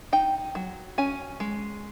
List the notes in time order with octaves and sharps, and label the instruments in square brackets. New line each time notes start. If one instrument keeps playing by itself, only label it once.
[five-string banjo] D#4 G5
F#3
C#4 G#5
G#3